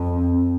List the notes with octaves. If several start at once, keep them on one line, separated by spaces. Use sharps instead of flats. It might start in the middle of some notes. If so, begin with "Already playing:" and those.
Already playing: F2 C4